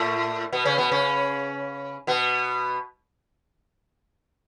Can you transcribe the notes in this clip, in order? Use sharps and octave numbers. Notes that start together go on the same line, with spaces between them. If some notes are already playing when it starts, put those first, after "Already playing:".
Already playing: A2 A3
B2 B3
C#3 C#4
B2 B3
C#3 C#4
B2 B3